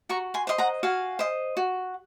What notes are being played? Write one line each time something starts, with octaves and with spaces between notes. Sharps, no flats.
F#4 A#5 C#6
G#5 C6
C5 D#5 C6
F#5 A#5
F#4 F5 G#5
C5 D#5
F#4